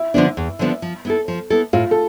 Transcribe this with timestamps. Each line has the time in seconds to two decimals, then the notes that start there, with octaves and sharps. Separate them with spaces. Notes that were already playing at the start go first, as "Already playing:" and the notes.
Already playing: E4
0.14 D3 F3 B3 D4
0.37 E2
0.59 D3 F3 B3 D4
0.82 F3
1.05 B3 E4 A4
1.28 F3
1.50 B3 E4 A4
1.73 A2 F4
1.91 A4